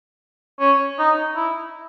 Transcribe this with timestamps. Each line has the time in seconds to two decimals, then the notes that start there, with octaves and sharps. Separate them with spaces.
0.60 C#4
0.99 D#4
1.36 E4